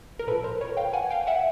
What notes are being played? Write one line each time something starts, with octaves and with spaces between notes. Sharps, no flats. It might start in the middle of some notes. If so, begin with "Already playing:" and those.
A#4
A#2 F3 A4 B4
A#4 C5
B4 C#5
F5 G5
F#5 G#5
F5 G5
E5 F#5